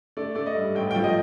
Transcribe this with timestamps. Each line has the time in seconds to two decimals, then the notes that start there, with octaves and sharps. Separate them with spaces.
0.17 A3 D5
0.35 A3 D5
0.46 D#5
0.56 G2
0.75 A1 G5
0.91 G5
0.95 F3
1.04 D#5